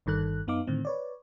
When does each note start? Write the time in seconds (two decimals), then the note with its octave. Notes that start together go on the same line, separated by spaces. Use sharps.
0.06 G1 G2 D#3 A4 F#6
0.47 F#2 B3 D#4 F5 D6
0.67 A2 D3 D#3 C4
0.85 B4 C#5 D5